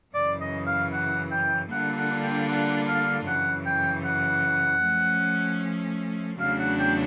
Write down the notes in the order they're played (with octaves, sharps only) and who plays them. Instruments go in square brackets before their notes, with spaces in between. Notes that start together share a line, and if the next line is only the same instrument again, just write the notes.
[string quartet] F#2 C#3 E3 [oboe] D5
[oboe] D#5
F5
F#5
G5
[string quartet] D3 G3 A#3 D4 F4 [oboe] F#5
[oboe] F#5
G5
F#5
F5
[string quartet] F#2 C#3 E3 [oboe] F#5
[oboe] G5
F#5
[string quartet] F3 A3 C#4
[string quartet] E2 C#3 F#3 A3 D4 [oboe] F5
[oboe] F#5
G5